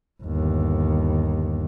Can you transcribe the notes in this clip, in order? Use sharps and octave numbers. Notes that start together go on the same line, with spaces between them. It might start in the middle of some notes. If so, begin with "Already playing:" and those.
G1 D#2